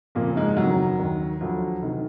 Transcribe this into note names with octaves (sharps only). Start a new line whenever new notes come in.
F#1 F2 A#2 F3 A#3
G#2 G#3
F#1 F2 D#3 F#3
D#2 D#3
D2 D3 F3 F#3
F1 D#3